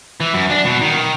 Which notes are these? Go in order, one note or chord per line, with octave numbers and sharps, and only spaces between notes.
E3
F#2
D4
B2
D#3